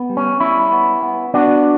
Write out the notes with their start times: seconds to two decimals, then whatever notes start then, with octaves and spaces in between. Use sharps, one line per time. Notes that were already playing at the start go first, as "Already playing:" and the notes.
Already playing: B3
0.09 G3
0.17 C#4
0.40 G3 C#4 E4
0.72 B3
1.03 B3
1.34 B3 D4 F#4